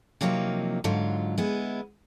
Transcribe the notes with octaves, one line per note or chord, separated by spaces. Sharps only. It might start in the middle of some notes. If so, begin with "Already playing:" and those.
C3 F3 F#3 A#3 D#4
G#2 D3 F#3 F4
G#3 B3 E4